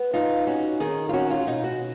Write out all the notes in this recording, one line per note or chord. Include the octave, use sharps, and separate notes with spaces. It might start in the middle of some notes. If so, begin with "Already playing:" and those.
Already playing: B3
D#4 F4
C#4 F#4
D#3 G#4
F4
C#4 F#4
F4
B2 D#4
F#4